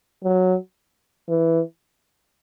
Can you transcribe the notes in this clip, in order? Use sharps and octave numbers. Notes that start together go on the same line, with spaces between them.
F#3
E3